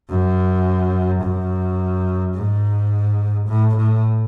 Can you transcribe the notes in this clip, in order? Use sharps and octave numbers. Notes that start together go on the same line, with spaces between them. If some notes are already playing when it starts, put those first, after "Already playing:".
F#2
F#2
G#2
A2
A2